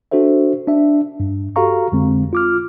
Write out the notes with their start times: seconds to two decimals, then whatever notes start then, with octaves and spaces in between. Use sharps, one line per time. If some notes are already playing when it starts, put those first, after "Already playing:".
0.11 D4 F#4 A4 C5 E5
0.67 D4 E5
1.20 G2
1.56 F#4 G4 A4 F5 A#5 C#6
1.92 F2 D3 G#3 C4
2.33 F4 D6 F6